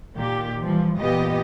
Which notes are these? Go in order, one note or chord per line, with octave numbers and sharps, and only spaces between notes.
A#2 D#3 G4
E3 F3 G3
A#2 E3 B3 G4 D#5